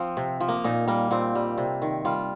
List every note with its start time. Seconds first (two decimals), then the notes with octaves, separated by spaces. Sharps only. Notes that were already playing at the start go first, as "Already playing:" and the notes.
Already playing: F3 C4
0.17 C3
0.40 F3
0.48 A#3
0.64 A#2 D#4
0.88 G3 A#3
1.11 A#2 C4
1.35 G3
1.58 C3
1.82 D#3
2.05 G3 F4